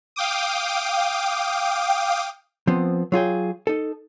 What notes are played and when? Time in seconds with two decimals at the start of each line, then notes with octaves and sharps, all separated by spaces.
0.16 F5 G5 D6 D#6
2.67 F3 B3 C4
3.12 F#3 F4 G#4 G5
3.67 D#4 A4